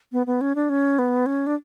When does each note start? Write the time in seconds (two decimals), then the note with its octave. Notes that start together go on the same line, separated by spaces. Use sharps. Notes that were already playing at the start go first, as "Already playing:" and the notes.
0.12 B3
0.27 B3
0.41 C#4
0.55 D4
0.70 C#4
0.99 B3
1.26 C#4
1.47 D4